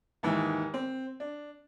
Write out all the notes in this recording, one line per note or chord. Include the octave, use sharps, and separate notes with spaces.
D#2 G#2 E3
C4
D4